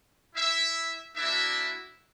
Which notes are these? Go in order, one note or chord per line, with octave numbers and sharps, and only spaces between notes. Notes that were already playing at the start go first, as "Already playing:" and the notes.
E4 E5
A#3 D4 E4 F#4 E5